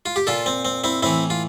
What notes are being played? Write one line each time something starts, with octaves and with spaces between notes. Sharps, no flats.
F4
G4
A#2 F4 A4
C4
C4
C4 E4
A2 E3 C4 E4
F4